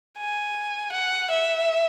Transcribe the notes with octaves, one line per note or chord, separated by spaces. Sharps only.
G#5
F#5
E5